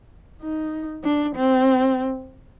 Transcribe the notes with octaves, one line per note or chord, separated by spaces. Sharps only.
D#4
D4
C4